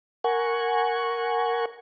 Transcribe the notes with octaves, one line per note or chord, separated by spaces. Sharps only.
A#4 F#5 G#5 C#6